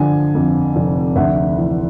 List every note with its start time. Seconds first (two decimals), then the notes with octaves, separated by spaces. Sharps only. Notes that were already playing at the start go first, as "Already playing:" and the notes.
Already playing: D3 F3 G#5
0.35 F2
0.75 F1
1.16 D2 E5 F#5
1.57 E3